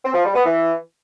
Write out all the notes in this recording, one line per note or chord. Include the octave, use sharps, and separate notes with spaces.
C4
F3
G3
B3
E3